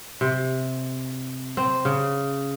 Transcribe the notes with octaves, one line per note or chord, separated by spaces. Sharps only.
C3
C4
C#3